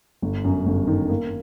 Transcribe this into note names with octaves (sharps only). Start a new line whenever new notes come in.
G1
F#2
G1
D#3
A#3